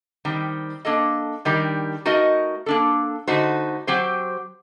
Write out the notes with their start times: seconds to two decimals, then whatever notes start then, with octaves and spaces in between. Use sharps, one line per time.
0.25 D#3 G3 C4
0.85 A#3 D4 A4 D#5
1.45 D#3 G3 D4 G4 A#4
2.05 A3 D#4 F#4 A#4 D#5
2.66 A#3 D4 A4
3.27 D3 A3 D#4 F#4 C5
3.87 F#3 C4 G4 C5